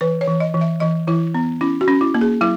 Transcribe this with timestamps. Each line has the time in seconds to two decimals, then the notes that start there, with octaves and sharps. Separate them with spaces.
0.01 E3 B4
0.21 C#5
0.28 E3
0.40 D#5
0.54 E3
0.61 E5
0.80 E3 D#5
1.07 E3 E4
1.34 B3
1.61 C#4 E4
1.81 F#4
1.88 C#4
2.01 E4
2.14 A#3
2.21 G#4
2.41 F#3 E4